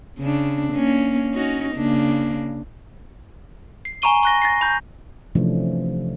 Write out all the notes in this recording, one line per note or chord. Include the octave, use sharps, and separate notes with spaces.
C#3 D4
A#3 C#4
C#4 D#4 F#4
C#3 A#3 D4
C7
G#5 A#5 B5 C#6 D#7 G7
C#6 F#6 A#6
A6 A#6 C7
B5 G6
C3 E3 F3 A3 C#4 D4